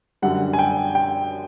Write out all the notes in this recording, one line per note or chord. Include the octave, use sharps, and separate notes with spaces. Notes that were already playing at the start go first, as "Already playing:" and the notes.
F#2 D3 G3 F#5
G#5
G5
G5